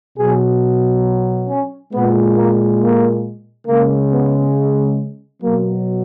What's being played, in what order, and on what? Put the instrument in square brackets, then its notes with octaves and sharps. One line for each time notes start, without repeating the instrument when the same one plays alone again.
[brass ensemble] B2 F#3 G#4
C#4
A#2 G#3 B3
A#3
A#3
C#3 G#3 A#3
B3
B2 F#3 A#3